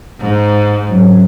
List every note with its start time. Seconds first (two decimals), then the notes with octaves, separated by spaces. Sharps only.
0.20 G#2
0.87 G#2 C#3 F#3